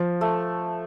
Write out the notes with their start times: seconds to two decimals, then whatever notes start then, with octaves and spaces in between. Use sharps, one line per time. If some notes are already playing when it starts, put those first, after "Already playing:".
Already playing: F3
0.21 A3